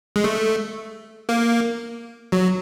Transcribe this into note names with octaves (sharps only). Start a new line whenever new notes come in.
G#3
A3
A#3
F#3